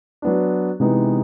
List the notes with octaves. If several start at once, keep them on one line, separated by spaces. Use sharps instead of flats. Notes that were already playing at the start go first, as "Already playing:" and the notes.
F#3 B3 D4
C3 E3 G#3 B3 D#4